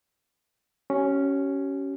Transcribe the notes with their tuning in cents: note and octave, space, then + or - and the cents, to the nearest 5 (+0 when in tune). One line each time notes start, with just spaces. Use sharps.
C#4 +0 G4 -45